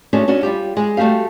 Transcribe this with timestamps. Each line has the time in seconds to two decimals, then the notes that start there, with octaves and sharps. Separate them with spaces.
0.13 G#3 A3 C#4 D4 F#4 A4
0.28 C#4 D4 F#4
0.43 G3 F4 G4
0.77 G#3
0.97 G3 A3 F#4 G4 F5